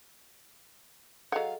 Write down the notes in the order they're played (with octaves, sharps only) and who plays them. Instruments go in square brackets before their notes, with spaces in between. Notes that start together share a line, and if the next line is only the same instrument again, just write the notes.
[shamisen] F#3 F#5 [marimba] G#4 A4 D#5 [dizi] F5